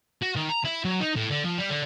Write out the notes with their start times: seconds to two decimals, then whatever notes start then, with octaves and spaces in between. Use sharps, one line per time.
0.22 F#4
0.35 D#3
0.49 A#5
0.65 E4
0.85 F#3
1.00 D#4
1.16 A2
1.30 D3
1.44 F3
1.58 G3
1.70 D3